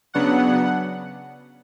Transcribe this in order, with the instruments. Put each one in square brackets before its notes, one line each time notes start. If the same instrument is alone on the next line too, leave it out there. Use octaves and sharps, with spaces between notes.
[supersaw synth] C#3 F#3 B3 D4 F#5